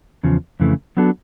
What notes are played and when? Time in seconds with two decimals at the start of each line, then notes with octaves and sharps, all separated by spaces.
0.23 E2 C#3 F3
0.60 F2 C#3 E3 A3
0.97 F#3 B3 D4 F#4 A4